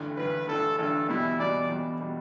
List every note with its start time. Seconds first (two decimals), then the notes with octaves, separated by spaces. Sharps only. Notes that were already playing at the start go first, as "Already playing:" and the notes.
Already playing: A1 G2 D3
0.17 A1 G2 D3 B4
0.47 A1 G2 D3 A4
0.78 A1 G2 D3 A4
1.08 E2 B2 G3 E4
1.39 E2 B2 G3 D5
1.69 E2 B2 G3
2.00 B2 G3